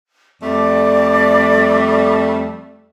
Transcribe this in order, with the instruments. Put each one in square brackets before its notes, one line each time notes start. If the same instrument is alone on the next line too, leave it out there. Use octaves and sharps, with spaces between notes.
[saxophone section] F2 G3 A3 [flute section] D5 D6